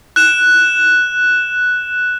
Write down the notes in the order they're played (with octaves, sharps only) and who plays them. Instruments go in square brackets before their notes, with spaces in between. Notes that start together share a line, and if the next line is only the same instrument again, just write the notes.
[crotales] F#6 E7